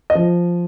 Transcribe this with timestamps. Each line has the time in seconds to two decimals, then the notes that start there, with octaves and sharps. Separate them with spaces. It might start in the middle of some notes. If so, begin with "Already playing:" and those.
0.10 D#5
0.15 F3